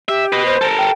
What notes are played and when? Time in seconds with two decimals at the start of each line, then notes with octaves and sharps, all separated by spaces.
0.09 G4 E5
0.32 B4 D#5
0.46 C5
0.61 A4 A#4
0.78 G5